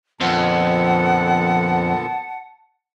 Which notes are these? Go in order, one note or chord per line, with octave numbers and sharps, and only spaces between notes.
F2 A#2 D3 B3 F#5 A5